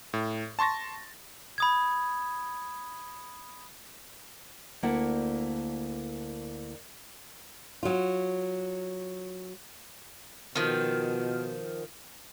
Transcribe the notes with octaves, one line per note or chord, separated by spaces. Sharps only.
A2
A5 C6 C#6 A6 A#6
B5 D#6 G#6
D2 A#3 E4 D5 F#5
F#3 F4
B2 D#3 F3